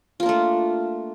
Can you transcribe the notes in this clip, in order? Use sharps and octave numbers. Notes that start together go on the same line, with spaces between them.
A3 A#3 D4 F4